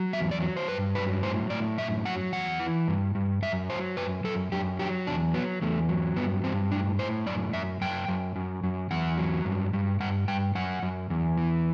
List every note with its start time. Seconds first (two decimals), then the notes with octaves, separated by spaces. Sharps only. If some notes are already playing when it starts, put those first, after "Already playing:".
Already playing: F#3
0.13 E2 E5
0.31 D5
0.41 F#3
0.57 C5
0.68 G2 B4
0.95 F#3 B4
1.23 A2 C5
1.50 A2 D5
1.78 F#2 E5
2.05 F#3 F#5
2.33 E2 F#5
2.60 E3
2.88 G2
3.15 G2
3.42 F#2 E5
3.69 F#3 C5
3.97 F#2 B4
4.24 F#2 A4
4.52 F#2 G4
4.79 F#3 G4
5.07 E2 D4
5.34 F#3 B3
5.62 E2 A3
5.89 F#3
6.16 G2 B3
6.44 G2 C4
6.71 A2 D4
6.99 A2 C5
7.26 F#2 D5
7.53 F#2 E5
7.81 F#2 G5
8.09 F#2
8.36 F#2
8.64 F#2
8.91 E2 F#5
9.18 F#3
9.45 G2
9.73 G2
10.00 G2 F#5
10.28 G2 G5
10.55 F#2 F#5
10.83 F#2
11.10 E2
11.38 E3